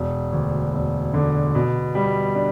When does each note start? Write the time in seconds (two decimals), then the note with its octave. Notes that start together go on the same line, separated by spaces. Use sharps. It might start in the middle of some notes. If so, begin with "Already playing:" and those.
Already playing: E1
0.32 D2
0.73 E1
1.14 D3
1.55 B2
1.95 G3
2.35 D4